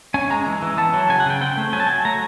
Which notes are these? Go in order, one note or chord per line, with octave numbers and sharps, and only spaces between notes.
C#4 G#5
G#3 A#5
E3
E3
B3 A5
F#3
C#3 G#5
F#5
C#3 G5
C4 G5
A3
F#3 G#5
A5
F#3 G#5
A3 A#5